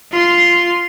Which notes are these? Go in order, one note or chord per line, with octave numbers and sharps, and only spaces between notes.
F4 C6